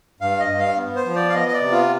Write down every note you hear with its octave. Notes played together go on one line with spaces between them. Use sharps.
G2 F5
D#5
G2
F5
B3
C5
F3
D5
F5
B3 D#5
D#5
D5
C3
F4